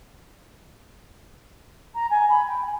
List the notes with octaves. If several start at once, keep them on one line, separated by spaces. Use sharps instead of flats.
A#5
G#5
B5
G5
G#5